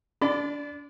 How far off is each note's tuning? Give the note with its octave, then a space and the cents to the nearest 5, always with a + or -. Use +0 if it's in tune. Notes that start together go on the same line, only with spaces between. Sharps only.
D4 -30 D5 +0 B5 +45